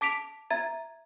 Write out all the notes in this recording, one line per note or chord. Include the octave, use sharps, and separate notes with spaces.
A5 D6 B6 D7 F7
E5 A#5 G#6 A6